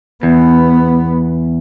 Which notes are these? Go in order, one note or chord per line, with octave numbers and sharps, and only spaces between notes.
E2 B3